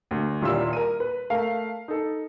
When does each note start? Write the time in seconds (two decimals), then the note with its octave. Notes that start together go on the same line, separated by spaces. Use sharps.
0.11 D2
0.42 D#1 A#2 G3 E4 F4 E6
0.73 A#4 D#7
1.00 B4
1.30 A3 A#4 F5
1.88 D#4 A4